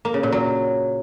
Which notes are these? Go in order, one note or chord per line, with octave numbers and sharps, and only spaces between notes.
A#3
C#3
A#2
F#3